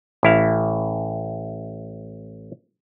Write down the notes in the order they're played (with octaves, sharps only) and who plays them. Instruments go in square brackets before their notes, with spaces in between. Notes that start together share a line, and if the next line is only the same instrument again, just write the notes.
[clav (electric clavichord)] A1 E4 F5